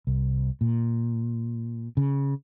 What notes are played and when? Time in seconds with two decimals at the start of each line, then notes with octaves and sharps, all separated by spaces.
0.07 C2
0.61 A#2
1.97 C#3